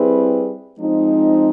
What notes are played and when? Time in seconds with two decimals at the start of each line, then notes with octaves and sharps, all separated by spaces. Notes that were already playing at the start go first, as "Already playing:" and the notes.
Already playing: G3 C4 E4 G#4 B4
0.79 F3 G#3 C4 D#4